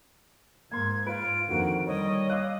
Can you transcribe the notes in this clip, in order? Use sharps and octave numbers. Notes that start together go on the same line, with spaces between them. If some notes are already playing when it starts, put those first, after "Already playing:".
G#2 A#3 C6 G#6
F4 B4 D7
F2 D3 D#3 A#3 F#4
G3 C#5 D#5
F5 D6 E6 F#6